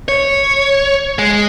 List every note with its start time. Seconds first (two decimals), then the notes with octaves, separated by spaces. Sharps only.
0.08 C#5
1.19 G#3